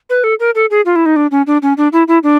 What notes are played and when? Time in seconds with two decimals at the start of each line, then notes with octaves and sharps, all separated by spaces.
0.10 B4
0.24 A4
0.40 A#4
0.55 A4
0.71 G#4
0.86 F4
0.96 E4
1.06 D#4
1.16 D4
1.31 C#4
1.47 D4
1.62 C#4
1.77 D4
1.93 E4
2.08 E4
2.23 D4